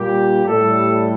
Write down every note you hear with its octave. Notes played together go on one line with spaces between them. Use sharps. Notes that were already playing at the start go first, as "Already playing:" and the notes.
Already playing: A#2 G3 G4
A2 G3 A4